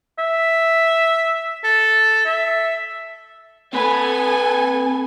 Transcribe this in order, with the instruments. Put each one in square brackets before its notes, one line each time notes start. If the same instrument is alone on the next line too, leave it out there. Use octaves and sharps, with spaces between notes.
[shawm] E5
A4
E5
[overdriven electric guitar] C4 B4 [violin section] A4 G#5